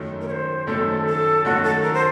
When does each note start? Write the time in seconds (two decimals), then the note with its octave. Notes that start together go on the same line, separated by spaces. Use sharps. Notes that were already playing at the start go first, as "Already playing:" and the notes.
Already playing: F#2 D#3 A3
0.21 A#4
0.28 C#5
0.31 C5
0.66 F#2 D#3 A3 A4
1.06 A4
1.44 F#2 D#3 A3 F#4
1.63 A4
1.82 A#4
1.94 C5